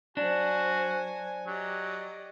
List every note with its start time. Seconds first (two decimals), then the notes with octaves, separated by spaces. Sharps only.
0.17 F#3 D4 F#4 C5 G#5
1.46 F#3 G4 D5 D#5